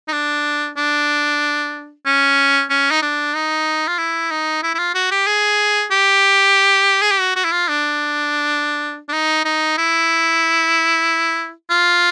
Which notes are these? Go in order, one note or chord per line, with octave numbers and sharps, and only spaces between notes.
D#4
D4
D4
C#4
C#4
D#4
D4
D#4
F4
E4
D#4
E4
E4
F4
F#4
G4
G#4
G4
G#4
G4
F#4
F#4
E4
F4
D4
D4
D#4
D#4
E4
F4